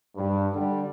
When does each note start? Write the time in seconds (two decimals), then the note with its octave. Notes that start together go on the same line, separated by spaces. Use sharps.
0.17 G2
0.54 D3 G3